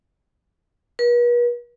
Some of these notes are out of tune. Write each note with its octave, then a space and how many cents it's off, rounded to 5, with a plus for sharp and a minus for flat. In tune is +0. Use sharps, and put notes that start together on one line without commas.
B4 -45